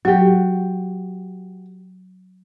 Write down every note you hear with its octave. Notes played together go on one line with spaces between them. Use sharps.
F#3 F#4 G4